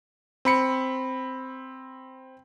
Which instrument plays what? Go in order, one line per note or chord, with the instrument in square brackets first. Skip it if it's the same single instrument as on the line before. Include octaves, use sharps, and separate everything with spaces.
[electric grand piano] C4 B5 C#7